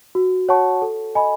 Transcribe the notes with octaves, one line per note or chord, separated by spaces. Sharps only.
F#4
C#5 F#5 A5 C#6
A4
D#5 G#5 B5